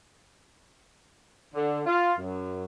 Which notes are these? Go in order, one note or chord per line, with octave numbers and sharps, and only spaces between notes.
D3
F4
F#2